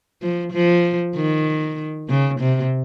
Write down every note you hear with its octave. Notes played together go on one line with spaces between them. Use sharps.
F3
F3
D#3
C#3
C3